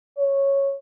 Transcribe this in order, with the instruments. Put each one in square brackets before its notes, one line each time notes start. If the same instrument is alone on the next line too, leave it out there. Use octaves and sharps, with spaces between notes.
[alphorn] C#5